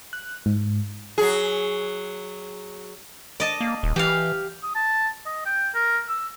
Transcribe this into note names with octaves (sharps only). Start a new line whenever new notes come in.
F#6
G#2
F#3 G#4
D5 D#5 A5
A#3
D#1
E3 G4 F5
D#6
A5
D#5
G5
A#4
E6